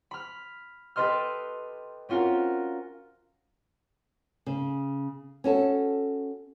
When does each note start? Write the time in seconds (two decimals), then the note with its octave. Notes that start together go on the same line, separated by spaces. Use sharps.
0.11 B5 F6
0.96 G4 A4 B4 D#5 C6 F6
2.09 C4 C#4 F4 F#4 A#4
4.46 C#3
5.44 C#4 F#4 A4